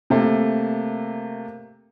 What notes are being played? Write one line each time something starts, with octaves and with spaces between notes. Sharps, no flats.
C3 A3 A#3